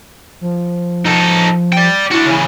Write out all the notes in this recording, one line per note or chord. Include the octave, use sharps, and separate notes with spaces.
F3
D#4 A4
D5 G5
D4 E4 F#4
C#3 E3